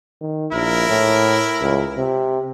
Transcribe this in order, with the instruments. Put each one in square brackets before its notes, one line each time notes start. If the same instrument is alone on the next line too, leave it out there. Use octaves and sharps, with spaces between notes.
[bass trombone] D#3
[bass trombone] A#1 [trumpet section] E4 A#4
[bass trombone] A2
C#2
C3